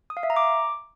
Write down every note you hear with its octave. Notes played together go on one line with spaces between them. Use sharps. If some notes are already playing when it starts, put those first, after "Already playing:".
D#6
F5
E5
A#5
D6